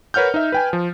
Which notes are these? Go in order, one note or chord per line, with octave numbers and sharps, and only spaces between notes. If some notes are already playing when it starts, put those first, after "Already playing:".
A#4 B4 C#5 F#5 F6 G6
D#4 E5
B4 G5 G#5
F3